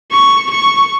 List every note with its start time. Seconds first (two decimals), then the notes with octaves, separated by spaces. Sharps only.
0.11 C#6
0.50 C#6